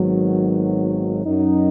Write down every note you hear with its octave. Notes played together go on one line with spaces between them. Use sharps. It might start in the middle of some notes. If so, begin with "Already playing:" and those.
Already playing: G#1 G#2 D#3 F#3 B3
F#2 F#3 D#4